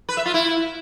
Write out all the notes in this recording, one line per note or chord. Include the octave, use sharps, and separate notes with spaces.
B4
E5
F4
E4